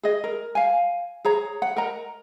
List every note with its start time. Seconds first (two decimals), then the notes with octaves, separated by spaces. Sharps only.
0.03 G#4 D#5
0.24 A#4
0.55 F5 G#5
1.25 G#4 C#5 A#5
1.62 F#5
1.76 A#4 D#5 A#5